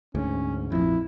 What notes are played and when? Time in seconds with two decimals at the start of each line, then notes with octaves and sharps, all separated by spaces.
0.15 D2 G#2 C#4
0.72 A#1 F2 E4